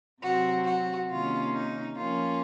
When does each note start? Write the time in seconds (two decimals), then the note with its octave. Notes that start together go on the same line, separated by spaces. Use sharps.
0.22 C3 F#3 C4 F#4
0.66 F#4
1.09 C3 D#3 A#3 C#4 F4
1.53 D#4
1.96 F3 A#3 C#4 F4